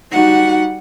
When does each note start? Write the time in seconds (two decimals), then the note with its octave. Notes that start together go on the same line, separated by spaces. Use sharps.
0.11 G3 D#4 F#4 F#5